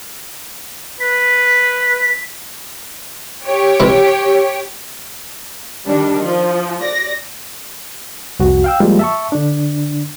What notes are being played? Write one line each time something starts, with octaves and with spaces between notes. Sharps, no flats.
B4 B6
G4 C#5
C3 E3 E4
D#3 G3 D4
F3
D5 A#6
C2 F2 F#4
F5 G5 E6
F3 G3 G#3 A#3 F4
E5 A5 C#6
D3 D4